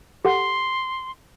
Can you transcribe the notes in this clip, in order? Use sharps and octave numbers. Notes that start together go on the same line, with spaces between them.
G4 A4 F#5 C6